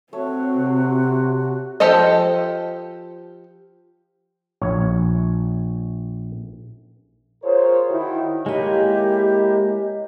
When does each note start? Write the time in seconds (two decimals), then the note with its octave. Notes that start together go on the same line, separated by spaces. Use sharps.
0.13 A3 C4 F#4 C#5
0.54 C3
1.80 F3 G4 A4 C5 D#5
4.62 A#1 C#5
7.43 F4 G#4 A#4 C5 C#5
7.89 D#3 E4 F#4
8.46 G#3 A#3 E4 G4 C#5 D#5